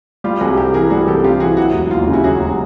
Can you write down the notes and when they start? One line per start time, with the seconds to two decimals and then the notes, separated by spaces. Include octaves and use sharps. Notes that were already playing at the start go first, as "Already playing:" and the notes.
0.24 G3 F4 G4
0.41 C2 F#4 G#4
0.57 C3 G4 A4
0.74 E3 G#4 A#4
0.90 G3 F#4 G#4
1.07 C2 G4 A4
1.24 C3 F4 G4
1.40 E3 F#4 G#4
1.57 F#3 E4 F#4
1.74 E1
1.91 D#2 F4
2.07 C#3
2.13 E4 F#4
2.24 F#3 F#4 G#4
2.40 E1